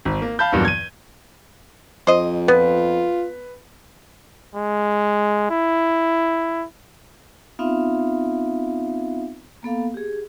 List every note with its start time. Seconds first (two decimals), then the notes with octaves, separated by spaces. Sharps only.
0.05 G#1
0.22 A#3
0.39 F5 A5 B5 G6
0.52 E2 G2 A#2 F#3
0.65 G#6 D#7
2.07 F2 C5 D#5
2.48 B3 F4 B4
4.56 G#3
5.51 E4
7.59 B3 C4 D#4 F4 E5 F5
9.63 A#3 B3 A4 F5
9.94 G4 G#4